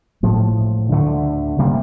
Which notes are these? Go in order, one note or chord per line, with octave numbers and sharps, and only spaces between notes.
A2 F3 A3
D2 D3 A3
C3 G3 A#3